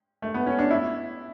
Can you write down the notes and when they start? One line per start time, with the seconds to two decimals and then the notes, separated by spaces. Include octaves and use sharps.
0.22 A3
0.34 B3
0.46 C#4
0.59 D4
0.71 E4